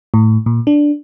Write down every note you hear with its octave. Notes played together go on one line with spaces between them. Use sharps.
A2
A#2
D4